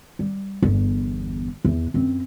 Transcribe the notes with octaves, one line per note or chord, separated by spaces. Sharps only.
G3
G1 E2
E2
F#2 C4